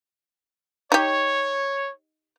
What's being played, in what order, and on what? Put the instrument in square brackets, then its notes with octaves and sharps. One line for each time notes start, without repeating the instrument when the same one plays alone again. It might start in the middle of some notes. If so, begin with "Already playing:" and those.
[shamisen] D#4 G4 [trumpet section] C#5